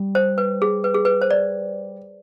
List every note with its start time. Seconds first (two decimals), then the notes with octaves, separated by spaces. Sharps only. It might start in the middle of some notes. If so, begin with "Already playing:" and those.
Already playing: G3
0.15 C5
0.38 B4
0.62 G#4
0.84 B4
0.94 G#4
1.05 B4
1.22 C5
1.31 D5